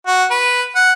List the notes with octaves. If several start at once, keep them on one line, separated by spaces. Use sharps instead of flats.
F#4
B4
F#5